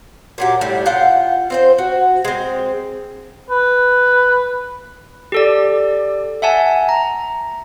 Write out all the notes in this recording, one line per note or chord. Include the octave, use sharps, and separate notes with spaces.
A#2 F#3 G4
A2 G3
F4 F#5 G5
C4 C5 G5
F#4
G#3 C4
B4
G4 A4 D5
E5 F#5 G#5 A5
A#5